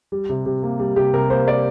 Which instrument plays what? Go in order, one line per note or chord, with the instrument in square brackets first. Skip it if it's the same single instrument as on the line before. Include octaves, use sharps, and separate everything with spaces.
[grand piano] G3
C3
C3
A#3
G3
C3 G4
C3 A#4
A#3 C5
G3 D5